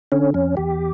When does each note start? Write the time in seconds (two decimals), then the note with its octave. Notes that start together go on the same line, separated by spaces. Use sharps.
0.12 D3 C#4
0.34 F2 C#4
0.57 E2 G4